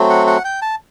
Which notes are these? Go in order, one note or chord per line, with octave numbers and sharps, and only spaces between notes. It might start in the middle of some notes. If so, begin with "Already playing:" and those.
Already playing: F#3 A3 C4 F#4
F#5
F#5
G5
A5